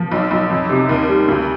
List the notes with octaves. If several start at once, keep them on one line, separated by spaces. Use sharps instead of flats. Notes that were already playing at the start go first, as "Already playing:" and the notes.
Already playing: F3
B1
B1
F2
C3
D#2
G3
D2